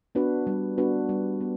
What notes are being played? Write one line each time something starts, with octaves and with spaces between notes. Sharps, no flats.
B3 D4 F#4 B4
G3
B3 D4 F#4 B4
G3
B3